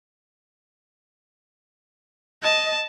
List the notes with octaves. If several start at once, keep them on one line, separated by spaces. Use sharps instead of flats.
D#5 A5